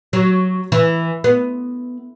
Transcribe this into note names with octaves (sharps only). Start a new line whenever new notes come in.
F#3
E3
B3